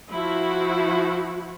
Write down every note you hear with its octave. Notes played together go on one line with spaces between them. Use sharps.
F3 E4 F#4